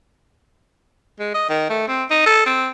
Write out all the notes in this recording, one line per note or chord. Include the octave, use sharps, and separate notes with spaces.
G#3
D#5
D#3
A3
C4
D#4
A4
C4